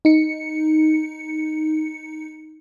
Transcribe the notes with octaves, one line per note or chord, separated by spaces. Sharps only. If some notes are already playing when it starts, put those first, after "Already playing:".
D#4 C#7